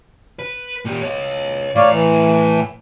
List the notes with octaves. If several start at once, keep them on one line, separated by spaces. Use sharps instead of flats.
B4
A#2 G4
C#5 D#5
A2 C#5 D5 F5 A#5
E3